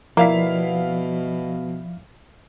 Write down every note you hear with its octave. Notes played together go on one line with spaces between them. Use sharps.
B2 F3 A#3 E4 D5 F5 B6